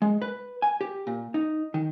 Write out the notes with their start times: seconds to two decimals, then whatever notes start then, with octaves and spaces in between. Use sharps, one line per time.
0.02 G#3
0.22 B4
0.62 G#5
0.81 G4
1.07 A#2
1.34 D#4
1.74 D#3